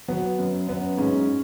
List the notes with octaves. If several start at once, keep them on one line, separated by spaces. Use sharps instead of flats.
F#3 B3
F#2
F#2 B3
G#2 C#4